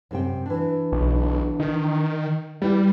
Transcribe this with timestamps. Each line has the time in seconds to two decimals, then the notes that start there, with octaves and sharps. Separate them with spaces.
0.11 F#2 C3 G5
0.46 E3 D4
0.92 B1
1.60 D#3
2.62 G3 E4 B4 D5